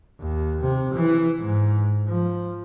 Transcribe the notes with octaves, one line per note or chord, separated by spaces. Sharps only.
D#2
C3
E3
G#2
F3